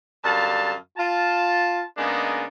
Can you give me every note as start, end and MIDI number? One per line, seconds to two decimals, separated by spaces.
0.24 0.73 42
0.24 0.73 50
0.24 0.73 55
0.24 0.73 77
0.24 0.73 81
0.97 1.82 65
0.97 1.82 81
1.97 2.44 49
1.97 2.44 56
1.97 2.44 58
1.97 2.44 59
1.97 2.44 62
1.97 2.44 63